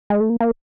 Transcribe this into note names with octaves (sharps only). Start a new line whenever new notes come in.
G#3
A3
A#3
A#3